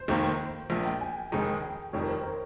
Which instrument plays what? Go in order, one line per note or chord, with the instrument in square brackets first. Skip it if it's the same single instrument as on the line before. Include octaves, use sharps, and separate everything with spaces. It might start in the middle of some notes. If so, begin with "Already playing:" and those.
Already playing: [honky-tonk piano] C5
[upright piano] F1 D#2 D#3 A#3
A#1 A#2 F3
[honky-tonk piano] G5
G#5
[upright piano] F1 D#2 D#3 G#3 D#4
[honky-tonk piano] G5
[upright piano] F1 F2 D#3 G3 [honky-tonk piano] C#5
[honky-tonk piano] A#4
C5
A#4